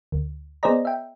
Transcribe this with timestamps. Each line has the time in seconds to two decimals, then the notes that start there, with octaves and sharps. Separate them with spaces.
0.12 D2
0.63 B3 G#4 C5 D5 D#5 A#5
0.85 E5 G5